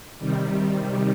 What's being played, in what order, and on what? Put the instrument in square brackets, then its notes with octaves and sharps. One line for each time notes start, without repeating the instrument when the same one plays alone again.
[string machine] C3 D#3 G3